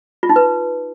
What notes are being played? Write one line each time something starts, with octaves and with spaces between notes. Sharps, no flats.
F4
D#4
B4